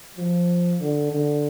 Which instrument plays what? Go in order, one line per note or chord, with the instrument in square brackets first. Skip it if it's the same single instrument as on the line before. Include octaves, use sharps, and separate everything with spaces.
[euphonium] F3
D3
D3